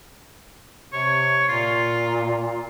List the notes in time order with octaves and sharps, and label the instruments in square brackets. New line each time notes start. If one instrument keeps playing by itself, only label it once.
[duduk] C3 [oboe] C#5
[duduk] A#2 [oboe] F4